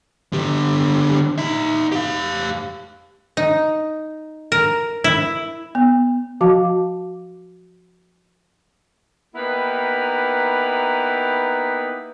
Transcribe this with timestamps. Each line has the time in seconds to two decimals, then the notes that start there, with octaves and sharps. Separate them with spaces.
0.33 D3 G4
1.38 D#4 E5
1.92 G4 F5
3.37 D#4
4.52 A#4
5.04 E4
5.75 B3
6.41 F3 F#4 F5 A5 D6
9.35 A#3 B3 D#4 E4 G4 B4